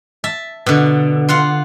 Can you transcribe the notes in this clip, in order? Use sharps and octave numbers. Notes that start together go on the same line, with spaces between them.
E5 A5
B2 D3
F4 F#5 C6